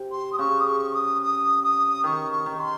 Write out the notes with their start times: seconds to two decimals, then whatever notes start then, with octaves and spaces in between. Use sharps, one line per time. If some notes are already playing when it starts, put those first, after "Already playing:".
Already playing: C3
0.12 C6
0.33 D#6
0.39 C#3 C#6
0.60 D#6
0.66 C#6
0.94 D#6
1.22 D#6
1.63 D#6
2.04 D#3 C#6
2.32 C#6
2.46 D#3
2.60 C6